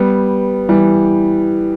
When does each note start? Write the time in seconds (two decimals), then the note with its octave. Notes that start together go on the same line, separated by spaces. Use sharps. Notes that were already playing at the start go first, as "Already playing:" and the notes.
Already playing: G3 B3
0.69 E3 G3